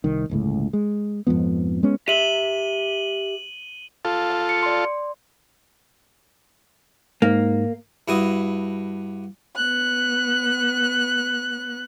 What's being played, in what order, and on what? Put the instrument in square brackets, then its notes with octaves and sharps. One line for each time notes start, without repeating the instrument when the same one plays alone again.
[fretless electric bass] C2 D#3
G1 C#2 A2
G#3
F2 G#2 F3 B3
G#3 B3 C#4
[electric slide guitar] G4 E5 [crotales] D#7 F#7 G7
[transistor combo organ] F4 A4
[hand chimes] F5
C#7
D5 C6
[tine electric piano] G#2 [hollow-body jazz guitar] A#3
[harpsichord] G2 E4 F#4 D#6
[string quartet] B3 F#6